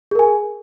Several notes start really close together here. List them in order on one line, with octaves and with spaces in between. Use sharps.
G#4 A#4 G#5